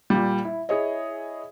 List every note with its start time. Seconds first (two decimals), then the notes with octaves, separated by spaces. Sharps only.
0.10 A#2 G3
0.45 E4
0.69 E4 G#4 C#5 D#5